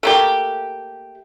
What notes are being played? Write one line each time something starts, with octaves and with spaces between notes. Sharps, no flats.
A3 A#3 G4